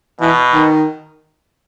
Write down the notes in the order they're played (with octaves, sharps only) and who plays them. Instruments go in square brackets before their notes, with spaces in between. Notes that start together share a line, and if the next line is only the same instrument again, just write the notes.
[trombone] B2 [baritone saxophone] E3
[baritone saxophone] D#3